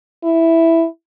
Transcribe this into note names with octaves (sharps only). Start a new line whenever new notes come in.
E4